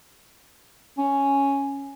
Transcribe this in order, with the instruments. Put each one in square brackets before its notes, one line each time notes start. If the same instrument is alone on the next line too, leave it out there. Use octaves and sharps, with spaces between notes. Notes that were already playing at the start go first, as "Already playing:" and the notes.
[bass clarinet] C#4